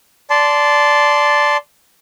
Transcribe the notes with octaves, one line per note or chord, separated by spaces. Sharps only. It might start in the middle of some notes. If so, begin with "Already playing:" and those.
D5 A5 C6